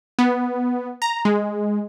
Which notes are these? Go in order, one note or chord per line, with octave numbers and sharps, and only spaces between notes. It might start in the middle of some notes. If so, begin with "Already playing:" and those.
B3
A#5
G#3